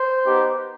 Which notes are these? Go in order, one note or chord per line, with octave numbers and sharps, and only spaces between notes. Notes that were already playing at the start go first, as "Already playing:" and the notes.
Already playing: C5
B3 D#4 G4